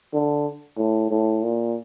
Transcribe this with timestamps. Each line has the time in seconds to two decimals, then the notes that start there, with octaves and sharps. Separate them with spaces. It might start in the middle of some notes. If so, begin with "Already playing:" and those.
0.13 D3
0.78 A2
1.11 A2
1.43 A#2